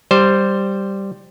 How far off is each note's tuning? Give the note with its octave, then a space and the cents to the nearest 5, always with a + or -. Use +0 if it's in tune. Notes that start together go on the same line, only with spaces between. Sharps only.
G3 +0 C5 +0